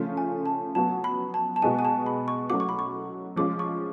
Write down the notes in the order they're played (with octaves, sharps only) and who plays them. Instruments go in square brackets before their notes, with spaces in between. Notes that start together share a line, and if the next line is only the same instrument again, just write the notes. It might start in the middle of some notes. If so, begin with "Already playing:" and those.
Already playing: [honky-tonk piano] C#3 F3 A3 C#4 F4
[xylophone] G#5
A5
[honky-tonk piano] F#3 B3 F#4 [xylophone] A5
[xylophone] B5
A5
A5
[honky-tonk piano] B2 G#3 B3 F#4 [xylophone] G#5
[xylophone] G#5
A5
B5
C#6
[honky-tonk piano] F#3 A3 C#4 F#4 [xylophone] D6
[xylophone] C#6
B5
C#6
[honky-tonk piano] F3 G#3 C#4 F4 [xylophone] D6
[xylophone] C#6